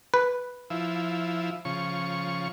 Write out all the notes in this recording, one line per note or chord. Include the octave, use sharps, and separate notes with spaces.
B4
F3 E4
C#3 F3 C#6